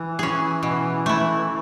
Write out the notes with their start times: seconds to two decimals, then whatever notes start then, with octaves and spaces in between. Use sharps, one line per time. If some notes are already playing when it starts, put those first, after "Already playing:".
Already playing: E3
0.19 C#4 G#4
0.63 B2
1.06 A3 E4